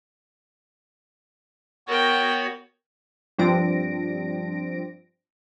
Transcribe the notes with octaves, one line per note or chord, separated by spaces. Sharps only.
B3 F#4 A#4 C#5 G5
G2 F3 C4 D4 A#6 D7